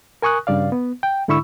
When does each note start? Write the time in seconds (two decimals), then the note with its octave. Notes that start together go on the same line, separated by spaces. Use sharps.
0.22 A#4 G#5 C#6 D#6 F#6
0.47 G2 C#3 D5 F5
0.72 B3
1.03 G5
1.28 G#2 D3 E4 B5 C#6 E6